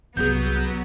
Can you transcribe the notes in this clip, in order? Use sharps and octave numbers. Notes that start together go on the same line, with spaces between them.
C2 F#3 B3 G#4 G6